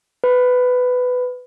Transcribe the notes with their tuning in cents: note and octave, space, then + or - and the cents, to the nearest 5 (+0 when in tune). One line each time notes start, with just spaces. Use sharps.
B4 +15